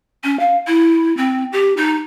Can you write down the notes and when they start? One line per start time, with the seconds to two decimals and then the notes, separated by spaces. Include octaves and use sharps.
0.24 C#4
0.39 F5
0.67 E4
1.17 C4
1.52 G4
1.76 D#4